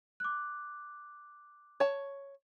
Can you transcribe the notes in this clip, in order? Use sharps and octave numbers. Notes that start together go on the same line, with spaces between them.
D6 F#6
C#5 A5